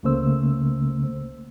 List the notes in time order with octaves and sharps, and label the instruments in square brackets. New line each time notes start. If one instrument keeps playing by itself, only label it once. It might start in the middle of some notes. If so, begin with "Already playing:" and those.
[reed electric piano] C#2 C#3 A3 A#3 C5 E6